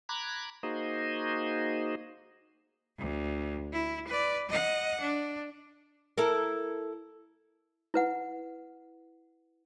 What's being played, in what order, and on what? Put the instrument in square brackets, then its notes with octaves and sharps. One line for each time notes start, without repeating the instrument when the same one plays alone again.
[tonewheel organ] A#5 B5 D6 F#6 G#6
A#3 D#4 F#4 G#4 C5 D#5
[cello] D2
E4
B4 D5
D#5 F#5
D4
[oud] E4 A4 A#4
[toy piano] E4 B4 F#5